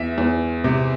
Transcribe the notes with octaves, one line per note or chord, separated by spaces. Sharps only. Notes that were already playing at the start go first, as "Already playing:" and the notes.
Already playing: E2 E5
E2
C3